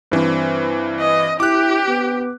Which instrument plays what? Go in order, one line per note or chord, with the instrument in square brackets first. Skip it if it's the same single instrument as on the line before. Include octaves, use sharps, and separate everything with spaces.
[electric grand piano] G2 E3 [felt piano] C4 D4 C5
[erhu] D#5
[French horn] E4 [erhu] G4 [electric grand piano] D6 F#6
[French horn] B3